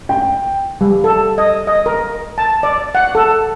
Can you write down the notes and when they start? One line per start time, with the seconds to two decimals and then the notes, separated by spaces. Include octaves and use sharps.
0.09 G5
0.81 G3
1.04 A4
1.38 D#5
1.67 D#5
1.86 A#4
2.38 A5
2.63 D5
2.95 F#5
3.15 A4